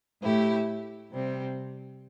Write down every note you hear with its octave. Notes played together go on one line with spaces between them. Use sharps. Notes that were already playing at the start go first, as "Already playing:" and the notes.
A2 A3 E4 G4
C3 G3 C4